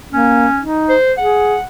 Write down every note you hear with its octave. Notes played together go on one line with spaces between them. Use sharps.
A#3 C#4
D#4
C5
G#4 F#5